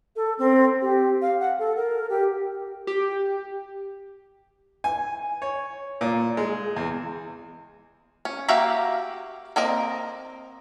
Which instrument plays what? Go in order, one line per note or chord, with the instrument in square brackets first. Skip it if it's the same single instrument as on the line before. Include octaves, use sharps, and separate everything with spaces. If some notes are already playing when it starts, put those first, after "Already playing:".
[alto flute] A4
C4
G4
F5
F#5
A4
A#4
G4
[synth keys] G4
[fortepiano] G#5
C#5
A#2
G#3
E2
[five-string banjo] C#4
A#3 F#4 G4 E5 F5
A#3 C4 A#4 D#5